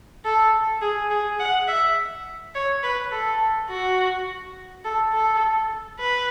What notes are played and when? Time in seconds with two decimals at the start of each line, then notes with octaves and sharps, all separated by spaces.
0.25 A4
0.82 G#4
1.11 G#4
1.40 F#5
1.68 E5
2.55 C#5
2.84 B4
3.12 A4
3.70 F#4
4.85 A4
5.13 A4
5.99 B4